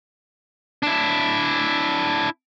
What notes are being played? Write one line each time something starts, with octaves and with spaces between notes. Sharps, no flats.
D4 E4